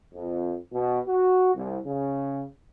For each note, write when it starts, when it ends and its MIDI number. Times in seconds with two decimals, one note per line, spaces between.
0.14 0.57 41
0.73 0.99 47
1.07 1.51 66
1.55 1.79 36
1.86 2.44 49